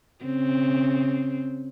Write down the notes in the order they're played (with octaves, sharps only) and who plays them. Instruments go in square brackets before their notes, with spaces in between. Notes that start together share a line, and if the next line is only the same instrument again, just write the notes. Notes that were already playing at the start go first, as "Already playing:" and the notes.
[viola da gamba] C#3 C4